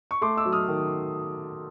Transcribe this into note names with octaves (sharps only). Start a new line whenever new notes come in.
C#6
A3 C6 D6
D6 E6
F#3
D#6 F6
D#3